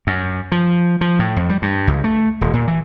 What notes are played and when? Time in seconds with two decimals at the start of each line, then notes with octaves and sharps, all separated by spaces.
0.07 F#2
0.52 F3
1.01 F3
1.19 A2
1.36 F2
1.49 G3
1.62 G2
1.87 C#2
2.04 A3
2.41 D#1
2.53 A#2
2.67 E3